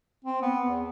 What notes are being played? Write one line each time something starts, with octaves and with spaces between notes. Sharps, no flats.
C4
B3
E2